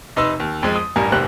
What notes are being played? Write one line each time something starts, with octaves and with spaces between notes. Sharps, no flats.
F1 D#4 B4 D#5 C6 E6
D#2
F2 F3 G#3
D#6
A1 G2 A#4 G#5
F1 D#2 G#2 G4 C5 F#6